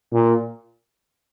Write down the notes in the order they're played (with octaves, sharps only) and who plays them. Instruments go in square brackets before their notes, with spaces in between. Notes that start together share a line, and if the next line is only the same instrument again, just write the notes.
[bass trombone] A#2